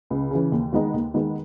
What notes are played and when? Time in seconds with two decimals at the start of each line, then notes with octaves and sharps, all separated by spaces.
0.10 C#2
0.31 C#3 E3
0.52 D#2
0.73 D#3 G#3 B3 D#4
0.94 D#2
1.14 D#3 G#3 B3 D#4